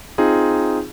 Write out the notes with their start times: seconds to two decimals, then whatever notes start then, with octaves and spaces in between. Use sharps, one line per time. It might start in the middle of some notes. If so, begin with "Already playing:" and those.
0.18 C4 D#4 F4 G#4